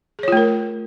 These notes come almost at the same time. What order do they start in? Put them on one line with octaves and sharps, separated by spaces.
G#4 C#5 F4 A3 A#4